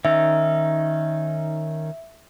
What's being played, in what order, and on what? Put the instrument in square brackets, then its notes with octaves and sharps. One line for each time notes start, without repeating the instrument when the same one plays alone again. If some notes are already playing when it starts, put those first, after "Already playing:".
[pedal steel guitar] D#3 C#4 D#4 [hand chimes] E5